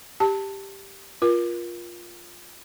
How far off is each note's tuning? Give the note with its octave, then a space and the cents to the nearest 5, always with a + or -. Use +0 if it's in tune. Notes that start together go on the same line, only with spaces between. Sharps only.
G4 +0 A5 +15
F4 +0 A#4 +35